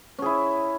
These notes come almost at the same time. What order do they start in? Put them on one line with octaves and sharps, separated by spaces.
C#4 G#4 E4